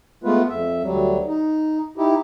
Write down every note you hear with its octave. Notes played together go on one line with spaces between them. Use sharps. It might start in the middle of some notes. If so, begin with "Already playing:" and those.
G#3 A3 B3 F4 B4
F2 E5
D2 F#3 G3
D#4
D#4 E4 G4